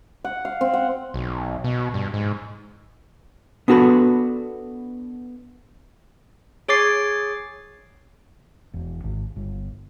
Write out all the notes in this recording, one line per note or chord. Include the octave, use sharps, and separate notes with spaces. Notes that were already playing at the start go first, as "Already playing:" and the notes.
F#5
F5
C4
F#5
B1
B2
G2
G#2
B3 D4 F#4 A4 B4
G#4 C#5 D6 A6 C7
E1
G#1
G1